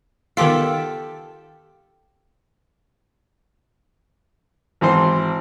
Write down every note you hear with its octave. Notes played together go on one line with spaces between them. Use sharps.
D#3 B3 F4 G4 A4 G5 A5 B6
G#1 E3 C5 C6